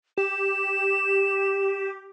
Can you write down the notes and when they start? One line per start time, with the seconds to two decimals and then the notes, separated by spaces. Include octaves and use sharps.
0.17 G4 E7